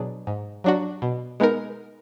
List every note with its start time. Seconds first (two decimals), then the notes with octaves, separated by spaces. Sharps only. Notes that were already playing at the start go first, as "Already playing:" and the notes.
Already playing: B2 F#3 D4 G#4
0.27 G#2
0.64 F#3 D4 F#4
1.02 B2
1.40 G#3 B3 D#4 A#4